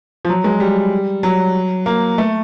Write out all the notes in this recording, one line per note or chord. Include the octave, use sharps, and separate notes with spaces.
F3
F#3
G#3
G3
F#3
A#3
A3